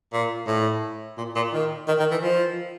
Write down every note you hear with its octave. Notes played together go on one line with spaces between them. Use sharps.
A#2
A2
A#2
A#2
D#3
D#3
D#3
E3
F3